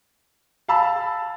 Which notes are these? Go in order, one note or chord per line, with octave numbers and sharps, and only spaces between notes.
F5 G#5 A5 B5 E6